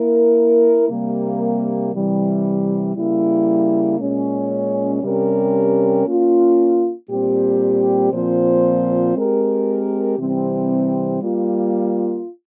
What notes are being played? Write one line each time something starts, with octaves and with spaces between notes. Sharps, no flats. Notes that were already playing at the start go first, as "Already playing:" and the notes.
Already playing: A#3 E4 A#4
C3 G3 A#3
C3 E3 G3
C#3 G3 A#3 E4
A#2 G#3 C#4
C3 G3 C#4 G4 A#4
A#3 C#4 F4
A#2 G3 C4 G4
A#2 F3 C4 F4 C5
G#3 C4 G4 A#4
C3 E3 G3 C4
G3 A#3 F4